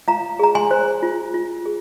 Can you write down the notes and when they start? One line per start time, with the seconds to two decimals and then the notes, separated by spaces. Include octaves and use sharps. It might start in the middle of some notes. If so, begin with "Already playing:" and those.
0.08 F4 F5 A#5
0.39 G#4 A#5
0.55 G#5 C6
0.71 C5
1.03 F4
1.34 F4
1.66 G#4